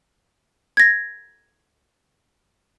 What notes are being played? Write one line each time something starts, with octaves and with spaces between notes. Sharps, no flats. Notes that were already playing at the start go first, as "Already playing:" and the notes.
G#6 A#6